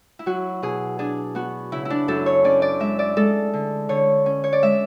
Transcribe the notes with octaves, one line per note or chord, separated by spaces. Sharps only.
E4
F#3 F#4
B2 G#4
D4 G#4
B3 F#4
C#3 E4
E4
D4
F#2 A4
C#5
C#4 D5
D5
G#3 E5
D5
G#3 A4
D3
D3 C#5
C#4
C#5
D5
G#3 E5